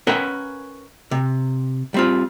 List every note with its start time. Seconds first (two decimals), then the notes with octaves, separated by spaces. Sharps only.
0.07 C#4 A#4 B4 E5 F#5 G5
1.11 C3
1.94 G3 C4 F4